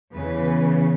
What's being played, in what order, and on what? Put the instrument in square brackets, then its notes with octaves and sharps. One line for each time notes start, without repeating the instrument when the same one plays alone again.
[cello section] E2 C#3 E3 B4